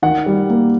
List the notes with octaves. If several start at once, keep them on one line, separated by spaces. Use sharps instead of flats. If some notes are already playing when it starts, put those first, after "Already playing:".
D#3 F#5
G3
A#3